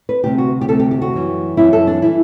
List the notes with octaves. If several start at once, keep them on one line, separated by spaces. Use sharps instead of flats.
B4
D2 C3 G3 G4
F#4
G4
D2 C3 G3 A4
G4
G4
F#4
F#2 E3 G3
F#2 E3 G3 E4
A4
D4
E3 G3 E4